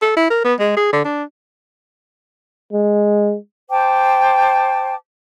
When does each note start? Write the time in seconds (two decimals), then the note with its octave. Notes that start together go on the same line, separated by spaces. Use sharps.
0.02 A4
0.17 E4
0.30 A#4
0.45 B3
0.60 G#3
0.77 G#4
0.93 D3
1.05 D4
2.73 G#3
3.69 C5 G5 A5 D6